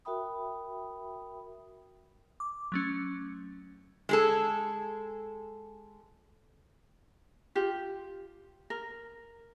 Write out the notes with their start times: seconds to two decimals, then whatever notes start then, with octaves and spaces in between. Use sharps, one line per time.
0.05 F#4 A#4 E5 G5 B5 D#6
2.40 D6
2.72 F#3 A3 C#4
4.09 G#3 G#4 A4
7.55 F4 G4
8.70 A#4